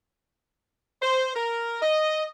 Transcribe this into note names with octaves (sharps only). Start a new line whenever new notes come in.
C5
A#4
D#5